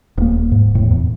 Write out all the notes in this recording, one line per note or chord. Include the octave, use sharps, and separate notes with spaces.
D#1 A#3
G#2
E2 A2
E2